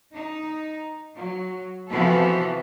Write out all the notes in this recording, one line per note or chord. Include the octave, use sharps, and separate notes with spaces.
D#4
F#3
C3 E3 F3 B3 F#4 A4